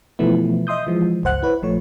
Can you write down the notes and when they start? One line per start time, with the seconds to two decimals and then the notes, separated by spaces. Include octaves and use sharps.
0.19 B2 E3 F3 A3 B3 E4
0.67 D#5 E5 C6 D#6 G6
0.87 E3 F3 G#3
1.23 G1 C#2 C5 F#5 F#6
1.43 E4 B4 C#5
1.62 A#1 F3 A3 C#5